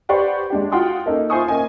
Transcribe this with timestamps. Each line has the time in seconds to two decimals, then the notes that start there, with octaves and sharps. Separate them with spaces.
0.09 G4 B4 C5 D5 F#5 C#6
0.50 G#3 D4 G4
0.72 F4 F#4 F#5 G5 C6 D#6
1.06 A#3 C#4 D#4 A4
1.30 F4 C5 E5 G#5 C#6 D#6
1.48 A#3 C#4 D#5 G#5